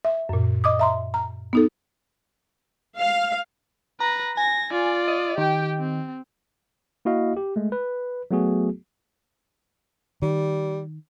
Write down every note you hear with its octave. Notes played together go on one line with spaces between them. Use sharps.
E5
F#2 A#2
D#5 D6 D#6
E5 A#5 C6
A#5
B3 D#4 A4
F5
B4 A#5 A#6
G#5 A#6
F4 D5
D#5
D#3 G4 G5
C4
A#3 E4 F#4 D#5 F5
G4
G#3 A3
B4
F#3 A3 B3 F#4 G#4
D#3 G3